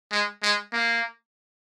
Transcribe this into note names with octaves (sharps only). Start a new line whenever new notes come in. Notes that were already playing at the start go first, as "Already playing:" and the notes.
G#3
G#3
A#3